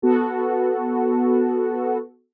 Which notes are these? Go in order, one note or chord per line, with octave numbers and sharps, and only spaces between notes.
B3 F#4 A4